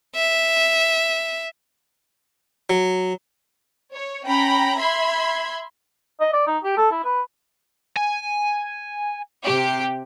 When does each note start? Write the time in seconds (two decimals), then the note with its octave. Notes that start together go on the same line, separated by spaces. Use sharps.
0.16 E5
2.70 F#3
3.94 C#5
4.26 C#4 G5 A#5 B5
4.78 E5 B5 C6 G#6
6.21 D#5
6.33 D5
6.47 D#4
6.64 G4
6.77 A4
6.92 E4
7.04 B4
7.97 G#5
9.44 C3 G4